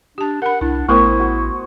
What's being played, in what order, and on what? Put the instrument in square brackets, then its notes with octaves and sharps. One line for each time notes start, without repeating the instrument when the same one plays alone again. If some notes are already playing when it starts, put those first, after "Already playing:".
[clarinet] D4 [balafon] G4 A5
[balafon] A#4 B5 [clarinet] F#5
[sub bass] C2 [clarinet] D4 [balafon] E4
[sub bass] A1 [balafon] A3 B3 A#4 [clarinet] E4 [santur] C5 D#5 C#6
[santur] F#4